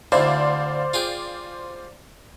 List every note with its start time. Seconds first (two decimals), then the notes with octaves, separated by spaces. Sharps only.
0.12 D2 E4 C5 D5 F5
0.94 F4 G#4 G5